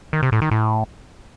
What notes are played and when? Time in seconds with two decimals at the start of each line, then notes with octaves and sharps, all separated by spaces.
0.13 D#3
0.23 C3
0.32 A2
0.42 D#3
0.51 A2